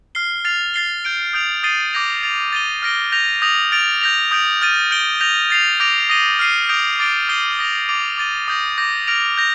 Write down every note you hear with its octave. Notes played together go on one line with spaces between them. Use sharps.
F6 C7 G7
F6 A6 C7 F7
A6 C7 G7
G6 D7 G7
D#6 G6 D7 F7
D#6 A6 C7 D#7 G7
D6 G6 A#6 F7
A6 D7 F7
A6 D#7 G7
F6 A#6 D7 G7
G6 A#6 F7
D#6 G6 A#6 F7
F6 A6 D7 F7
G6 A#6 F7
D#6 G6 D7
F6 A6 D#7
G6 D7 G7
G6 A#6 F7
A6 C7 F7
D6 G6 A#6 D7 F7
D#6 A#6 D#7 G7
F6 C7 D#7
D#6 G6 A#6 D7 F7
D6 A6 D7 G7
D#6 G6 C7 D#7 G7
D#6 A#6 F7
D6 A6 D7 F7
D6 A6 D#7 G7
D#6 G6 A#6
D6 G6 A#6
F6 A#6 D7 F7
G6 A#6